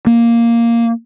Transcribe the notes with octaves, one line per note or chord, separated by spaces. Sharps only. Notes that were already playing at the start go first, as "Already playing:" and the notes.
A#3